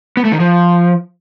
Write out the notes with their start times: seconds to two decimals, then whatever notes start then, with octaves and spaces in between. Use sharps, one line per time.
0.17 B3
0.25 A3
0.32 D#3
0.40 F3